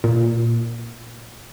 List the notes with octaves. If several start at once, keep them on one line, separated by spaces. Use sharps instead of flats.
A#2